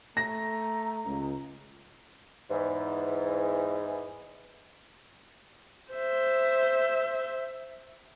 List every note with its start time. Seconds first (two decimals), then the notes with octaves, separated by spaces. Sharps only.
0.17 A3 A#5 A#6
1.06 C#2
2.50 E2 G#2 E3
5.93 C5 E5